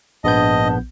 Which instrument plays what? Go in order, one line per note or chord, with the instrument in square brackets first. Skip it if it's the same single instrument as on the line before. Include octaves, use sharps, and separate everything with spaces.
[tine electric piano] A#1 B3 G6 [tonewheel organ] G#2 D4 [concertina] D#5 [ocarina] A5